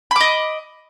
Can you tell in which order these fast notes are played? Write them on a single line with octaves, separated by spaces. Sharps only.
B5 D6 D#5